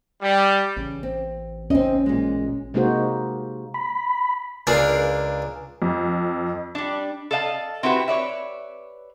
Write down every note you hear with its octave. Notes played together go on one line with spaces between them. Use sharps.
G3
A1 C#3
C4
C4 C#4 D#4 D#5
A#2 G#3
C3 G#3 A#3 D#4 F#4 C5
B5
C#2 D4 G#4 A#4 F5
F2
G3 D4
A4 D5 D#5 F5 F#5 A5
C4 E4 F#4 G4 B4
B4 C#5 D5 E5